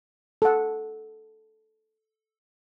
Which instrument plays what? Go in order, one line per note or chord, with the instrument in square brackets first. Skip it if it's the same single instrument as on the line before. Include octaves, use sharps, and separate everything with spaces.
[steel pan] A4 F#5